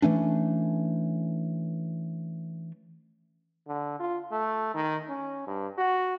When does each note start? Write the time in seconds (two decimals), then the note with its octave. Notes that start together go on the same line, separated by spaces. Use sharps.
0.02 E3 A3 C#4 D4
3.68 D3
4.00 F4
4.32 A3
4.74 D#3
5.09 C#4
5.47 G2
5.78 F#4